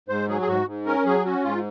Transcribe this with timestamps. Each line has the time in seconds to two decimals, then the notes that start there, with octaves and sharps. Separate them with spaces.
0.08 G#2 C5
0.28 F#3 G#4
0.41 G#4
0.47 G#2 F#4
0.66 G#2
0.86 C#4 A#4
1.06 F#3 G#4
1.25 C#4 F#4
1.44 G#2 F4